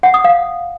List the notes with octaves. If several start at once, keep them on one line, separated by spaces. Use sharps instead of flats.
F#5
D#6
F5